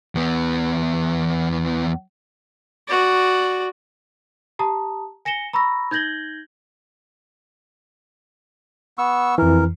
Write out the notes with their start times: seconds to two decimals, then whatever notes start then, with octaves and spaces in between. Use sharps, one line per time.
0.15 E2 B3
2.88 F#4 D5
4.59 G4 A5 A#5 D#6
5.25 G#5 A#6 C#7 E7 G7
5.53 A#5 B5 C#6 E6 A#6
5.91 D#4 G6 G#6 A#6 F#7 G7
8.98 B3 C#6 E6
9.38 F2 E3 A#4